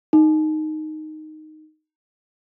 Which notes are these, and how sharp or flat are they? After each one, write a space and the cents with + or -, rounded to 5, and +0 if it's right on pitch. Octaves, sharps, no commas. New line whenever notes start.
D#4 -5